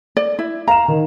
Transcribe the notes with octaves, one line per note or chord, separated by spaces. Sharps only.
D5
E4
F5 A#5 E7
D#3